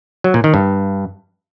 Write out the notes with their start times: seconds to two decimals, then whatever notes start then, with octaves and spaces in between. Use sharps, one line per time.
0.24 F#3
0.34 A#2
0.44 D#3
0.54 G2